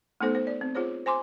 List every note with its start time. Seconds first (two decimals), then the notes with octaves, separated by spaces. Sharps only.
0.21 A3 B3 D#4 A4 C5
0.35 C5
0.47 D5
0.61 C4
0.75 F4 G#4 C5 C#5
1.06 C5 G#5 C6 D6